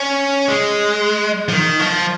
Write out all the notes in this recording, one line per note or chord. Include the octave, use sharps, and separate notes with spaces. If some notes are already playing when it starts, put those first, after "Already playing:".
Already playing: C#4
G#3
F3
D#3
F3